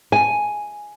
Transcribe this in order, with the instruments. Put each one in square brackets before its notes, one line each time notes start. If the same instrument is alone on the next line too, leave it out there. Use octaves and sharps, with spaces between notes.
[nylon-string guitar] G#5